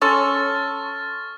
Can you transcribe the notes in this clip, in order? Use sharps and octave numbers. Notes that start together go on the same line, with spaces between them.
C#4 A4 C6 C#6 F6 A6